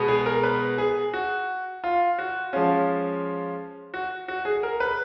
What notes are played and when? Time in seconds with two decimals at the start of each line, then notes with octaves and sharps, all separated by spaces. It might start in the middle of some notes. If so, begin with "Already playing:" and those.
Already playing: B2 G#3 B3
0.08 G#4
0.26 A#4
0.43 B4
0.78 G#4
1.13 F#4
1.84 F4
2.19 F#4
2.53 F3 G#3 C#4 F4
3.94 F#4
4.28 F#4
4.45 G#4
4.63 A#4
4.80 B4